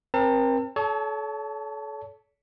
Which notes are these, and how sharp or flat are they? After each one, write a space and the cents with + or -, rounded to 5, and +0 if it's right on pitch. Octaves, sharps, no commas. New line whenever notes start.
C4 +25 A#4 +35 A5 +40
A4 -35 C#5 +35 A5 +0